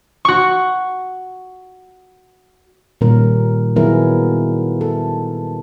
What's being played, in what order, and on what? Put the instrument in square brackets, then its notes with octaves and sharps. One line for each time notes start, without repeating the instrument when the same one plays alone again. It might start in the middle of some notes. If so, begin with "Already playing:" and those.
[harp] F#4 C#6
[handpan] A#2 D#3 G3 C#4 A#4
D#3 F#3 B3 E4 G#4 A#4
A4